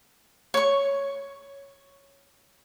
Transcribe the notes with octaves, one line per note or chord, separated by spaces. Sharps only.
C#5 C#6